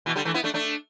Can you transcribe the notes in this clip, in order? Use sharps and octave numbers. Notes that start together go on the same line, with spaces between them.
B2 E3
D3 G3
E3 A3
B3 E4
A3 D4
A3 D4